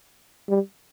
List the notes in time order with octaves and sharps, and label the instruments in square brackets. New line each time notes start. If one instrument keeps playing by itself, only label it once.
[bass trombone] G3